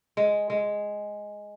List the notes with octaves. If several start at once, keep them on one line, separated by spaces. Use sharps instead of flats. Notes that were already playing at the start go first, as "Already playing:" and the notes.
G#3
G#3